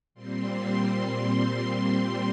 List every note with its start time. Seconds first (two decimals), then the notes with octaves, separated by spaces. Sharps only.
0.14 A#2 G3 C4 C6
0.64 C6